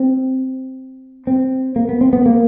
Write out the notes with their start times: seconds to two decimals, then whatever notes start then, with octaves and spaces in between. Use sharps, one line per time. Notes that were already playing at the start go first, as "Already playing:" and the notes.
Already playing: C4
1.27 C4
1.76 A#3
1.89 B3
2.01 C4
2.13 B3
2.26 A#3